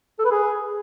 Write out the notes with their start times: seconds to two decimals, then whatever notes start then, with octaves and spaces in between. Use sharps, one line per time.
0.19 A4
0.25 B4
0.31 G#4